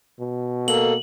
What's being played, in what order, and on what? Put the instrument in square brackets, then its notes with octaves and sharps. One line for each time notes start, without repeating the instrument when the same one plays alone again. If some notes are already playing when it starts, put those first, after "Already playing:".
[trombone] B2
[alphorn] A#3 [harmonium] A4 [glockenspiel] F#7